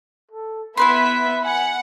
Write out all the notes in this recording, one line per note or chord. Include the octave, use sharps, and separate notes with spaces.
A4
B3 E4 B4 E5 B5 C6 B6
F#5 G#5